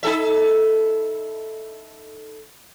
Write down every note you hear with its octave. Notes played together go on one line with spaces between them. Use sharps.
D#4 A4 E5